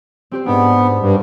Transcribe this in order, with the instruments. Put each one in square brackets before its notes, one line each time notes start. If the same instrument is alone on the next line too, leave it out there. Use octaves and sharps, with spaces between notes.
[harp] C4 G4 C5
[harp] G#2 D4 [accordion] B3
[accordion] G2